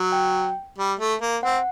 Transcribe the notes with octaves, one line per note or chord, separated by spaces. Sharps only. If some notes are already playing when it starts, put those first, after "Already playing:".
Already playing: F#3
G5
G3
A3
A#3
C4 F#5